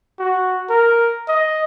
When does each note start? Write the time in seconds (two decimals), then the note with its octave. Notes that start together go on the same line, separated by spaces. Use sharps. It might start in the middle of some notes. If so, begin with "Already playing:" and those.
0.19 F#4
0.69 A#4
1.28 D#5